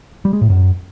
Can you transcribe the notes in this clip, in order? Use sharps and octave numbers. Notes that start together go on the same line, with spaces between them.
G3
G#3
A2
F#2